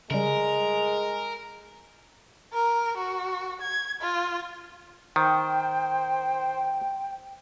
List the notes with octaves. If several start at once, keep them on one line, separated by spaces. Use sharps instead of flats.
C#3 G3 G#3 A#4
A#4
F#4
G#6
F4
D#3 C5 G5